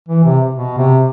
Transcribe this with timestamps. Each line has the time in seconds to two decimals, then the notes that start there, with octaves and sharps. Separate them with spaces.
0.08 E3
0.24 C3
0.55 B2
0.78 C3